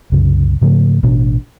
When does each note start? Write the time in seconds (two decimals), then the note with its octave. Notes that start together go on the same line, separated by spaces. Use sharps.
0.12 C2 F#2 C#3
0.61 G#2 C#3 F3 A3
1.03 A1 B2 D4